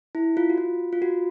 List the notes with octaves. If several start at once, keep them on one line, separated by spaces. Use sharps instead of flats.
E4
F4
F#4
F4
F4
F#4